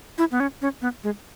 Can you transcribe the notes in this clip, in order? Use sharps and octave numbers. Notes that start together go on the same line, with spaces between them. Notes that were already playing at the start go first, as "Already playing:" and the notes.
E4
B3
C#4
C#4
B3
G#3